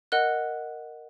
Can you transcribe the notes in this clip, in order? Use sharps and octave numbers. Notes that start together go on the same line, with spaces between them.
A#4 D#5 F#5 F#6